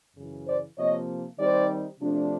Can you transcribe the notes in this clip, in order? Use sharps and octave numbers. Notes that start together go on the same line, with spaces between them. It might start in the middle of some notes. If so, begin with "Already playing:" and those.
F#2 C#3 E3
C5 D5
C3 F3 A#3 C#5 D#5
D#3 G3 C4 D#4 C5 D5
C3 F3 A3 D4